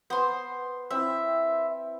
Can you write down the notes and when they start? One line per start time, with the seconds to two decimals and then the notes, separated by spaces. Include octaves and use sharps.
0.10 B3 C5 C6
0.91 C4 E4 E5